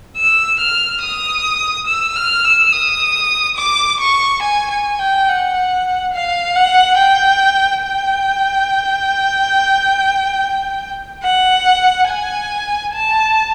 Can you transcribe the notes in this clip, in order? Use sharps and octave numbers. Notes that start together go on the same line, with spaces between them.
E6
F6
D#6
E6
F6
E6
D#6
D6
C#6
G#5
G#5
G5
F#5
F5
F#5
G5
G5
F#5
G#5
A5